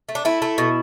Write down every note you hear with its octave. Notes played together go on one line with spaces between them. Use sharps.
A3
D4
A3 E4
A3
B2